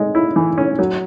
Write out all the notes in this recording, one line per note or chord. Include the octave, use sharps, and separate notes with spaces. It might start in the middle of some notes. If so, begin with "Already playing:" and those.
Already playing: G#3
E4
E3
C#4
F#3